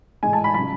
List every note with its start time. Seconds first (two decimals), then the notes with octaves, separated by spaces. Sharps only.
0.23 A2 E3 G#3 G#5
0.33 A5
0.44 B5
0.54 C#3 F#3 B5